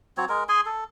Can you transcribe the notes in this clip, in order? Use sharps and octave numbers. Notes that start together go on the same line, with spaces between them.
F#3 C4 C#5
G#3 A#4
G#4 G#5 C6
A4